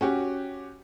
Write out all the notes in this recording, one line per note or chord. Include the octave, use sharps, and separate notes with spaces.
C#4 F#4 G4